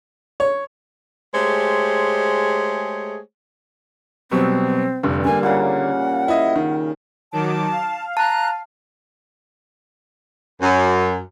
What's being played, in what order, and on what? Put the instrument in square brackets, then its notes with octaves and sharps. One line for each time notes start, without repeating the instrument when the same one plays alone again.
[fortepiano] C#5
[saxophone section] G#3 A3 G4 G#4 C5 C#5
[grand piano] B2 F#3 G3 [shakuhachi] C4
[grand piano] F1 D3 [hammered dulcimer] G2
[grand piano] D3 A#3 [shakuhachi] G#5
[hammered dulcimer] A#2 C#3 [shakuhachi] F#5
[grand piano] E4 D#5
D#3
[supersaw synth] D#3 F#3 D6 [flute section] A5
[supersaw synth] F5
[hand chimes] A5 [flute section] A#5 F#6
[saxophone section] F#2